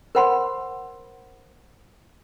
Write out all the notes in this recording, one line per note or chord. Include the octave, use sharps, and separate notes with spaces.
A#4 C5 F#5 B5 C6